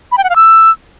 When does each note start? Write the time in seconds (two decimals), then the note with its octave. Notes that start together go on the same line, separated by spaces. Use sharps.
0.12 B5
0.18 G5
0.24 F#5
0.30 F5
0.36 E6